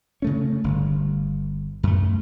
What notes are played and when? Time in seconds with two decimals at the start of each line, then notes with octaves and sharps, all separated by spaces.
0.22 C#3 A3 C#4
0.64 G1
1.83 F#2 A3